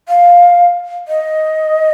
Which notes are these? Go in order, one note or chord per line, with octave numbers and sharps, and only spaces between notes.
F5
D#5